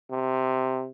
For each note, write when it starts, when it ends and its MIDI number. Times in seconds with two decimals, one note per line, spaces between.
0.11 0.89 48